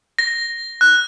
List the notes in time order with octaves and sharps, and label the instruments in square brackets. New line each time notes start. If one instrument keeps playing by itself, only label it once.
[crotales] A#6
F#6